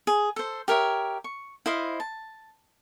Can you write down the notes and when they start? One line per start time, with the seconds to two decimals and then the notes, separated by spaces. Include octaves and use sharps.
0.07 G#4
0.36 A4 C5
0.68 G4 A#4 C#5 E5
1.24 C#6
1.66 E4 C5 D#5 F5
2.00 A5